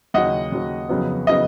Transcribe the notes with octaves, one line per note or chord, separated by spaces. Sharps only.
D#2 C#3 F#3 D#5 F#5
D#2 C#3 F#3
F2 C#3 F#3 B3
C#3 F#3 B3 D#5